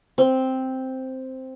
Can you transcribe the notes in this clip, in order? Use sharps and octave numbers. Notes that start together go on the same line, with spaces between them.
C4